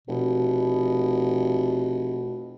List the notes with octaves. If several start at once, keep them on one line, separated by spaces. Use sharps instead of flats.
F1 B2